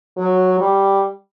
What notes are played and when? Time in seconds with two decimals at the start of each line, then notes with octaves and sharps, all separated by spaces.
0.18 F#3
0.60 G3